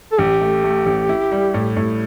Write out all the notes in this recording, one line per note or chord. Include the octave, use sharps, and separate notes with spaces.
A4
A1 G4
A3
A3
A1
E4
G3
A2
A2